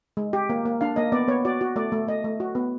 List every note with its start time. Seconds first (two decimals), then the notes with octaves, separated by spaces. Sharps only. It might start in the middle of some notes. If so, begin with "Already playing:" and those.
0.17 G#3
0.33 G4
0.50 A#3
0.66 A#3
0.81 D4 F5
0.96 A#3 D#5
1.12 B3 D5
1.28 B3 C#5
1.45 F#4 D5
1.61 F#4
1.76 A3 D5
1.92 A3
2.08 A3 D#5
2.24 A3
2.40 F#4
2.55 B3